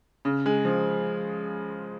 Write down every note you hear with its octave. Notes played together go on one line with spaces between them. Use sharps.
C#3
G#3
F3